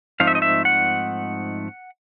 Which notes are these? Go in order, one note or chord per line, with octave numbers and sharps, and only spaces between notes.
G#2 F3 A3 C4 D#4 F5
E5
D#5
E5
F#5